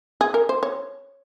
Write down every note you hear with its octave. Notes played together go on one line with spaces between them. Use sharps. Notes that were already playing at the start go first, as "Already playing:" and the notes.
G#4
A#4
C5
C#5